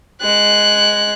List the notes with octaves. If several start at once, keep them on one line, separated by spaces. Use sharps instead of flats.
G#3 F#6